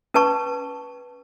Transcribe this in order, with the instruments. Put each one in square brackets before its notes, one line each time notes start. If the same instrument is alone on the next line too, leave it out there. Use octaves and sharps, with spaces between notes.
[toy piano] C#4 B4 A5 C#6